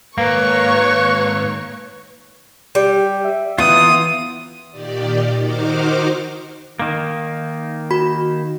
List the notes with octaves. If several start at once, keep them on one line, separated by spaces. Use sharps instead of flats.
G#2 D#3 A#3 B4 C#5 C#6
G3 G4
E5
E3 B3 D#4 F4 D#6
A#2 D#3 G4 D5
D#3 D#4 F#4 C5 D6 F6
D#3 A#3
F#4 B5